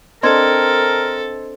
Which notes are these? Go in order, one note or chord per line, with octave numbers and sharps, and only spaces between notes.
C4 D4 A4 A#4 D#5 C6 G#6